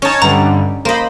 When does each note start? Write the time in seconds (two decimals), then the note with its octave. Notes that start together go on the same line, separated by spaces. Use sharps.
0.02 C#4 D#4 C#5 A5
0.22 G2 D3 G3 F#5 A#5
0.85 A#3 C5 D#5 B5